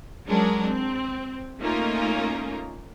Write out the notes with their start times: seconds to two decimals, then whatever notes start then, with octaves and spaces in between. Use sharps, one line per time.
0.28 F#3 G#3 C#4 D4 A#4
0.67 C4
1.60 A3 A#3 C#4 D#4 F4 A#4